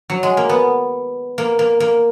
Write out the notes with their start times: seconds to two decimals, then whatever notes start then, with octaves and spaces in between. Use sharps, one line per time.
0.10 F#3
0.23 G#3
0.37 A#3
0.49 B3
1.38 A#3
1.59 A#3
1.80 A#3